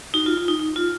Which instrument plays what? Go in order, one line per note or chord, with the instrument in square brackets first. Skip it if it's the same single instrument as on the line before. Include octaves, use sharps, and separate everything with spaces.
[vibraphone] D#4 F#4
F4
F4
D#4
D#4
F4